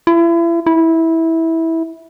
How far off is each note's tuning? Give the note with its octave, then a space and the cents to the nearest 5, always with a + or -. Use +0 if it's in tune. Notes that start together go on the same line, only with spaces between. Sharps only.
E4 +35
E4 -15